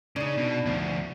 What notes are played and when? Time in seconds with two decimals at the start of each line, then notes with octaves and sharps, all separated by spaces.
0.16 C#3 D4 D#4
0.38 B2
0.66 D2 F3